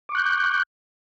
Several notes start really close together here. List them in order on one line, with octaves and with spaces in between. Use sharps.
D6 C#6 F#6 G6